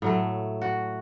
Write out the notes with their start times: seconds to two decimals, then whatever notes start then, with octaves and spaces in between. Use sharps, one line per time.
0.02 A2 F#3 A3
0.62 F#4